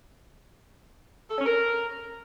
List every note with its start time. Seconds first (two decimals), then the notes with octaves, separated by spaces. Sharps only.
1.31 A4
1.38 C#4
1.46 A#4